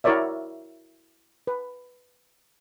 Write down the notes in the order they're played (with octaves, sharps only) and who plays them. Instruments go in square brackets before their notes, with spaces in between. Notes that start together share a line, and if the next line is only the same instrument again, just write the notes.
[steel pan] E4 F#4 A#4 C#5 D5 E5
B4